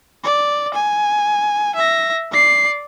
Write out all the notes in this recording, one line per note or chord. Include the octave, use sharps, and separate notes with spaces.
D5
G#5
E5 A#6
D5 C7